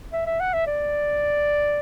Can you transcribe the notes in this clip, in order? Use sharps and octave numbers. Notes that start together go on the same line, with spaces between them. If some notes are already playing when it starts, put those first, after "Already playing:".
E5
E5
F#5
E5
D5